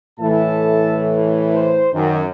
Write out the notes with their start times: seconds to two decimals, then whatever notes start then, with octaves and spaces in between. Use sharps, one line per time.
0.20 A2 E3 A4 E5 A5
1.54 C5
1.93 F#2 D#3